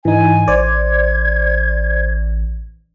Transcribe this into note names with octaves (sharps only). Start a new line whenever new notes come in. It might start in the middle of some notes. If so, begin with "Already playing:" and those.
G#2 E3 D#4 G#5
A1 C5 D5 G#6